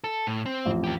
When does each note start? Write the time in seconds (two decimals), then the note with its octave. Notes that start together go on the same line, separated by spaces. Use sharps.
0.04 A4
0.27 A2
0.46 C4
0.65 A1 F2
0.84 D#2 G4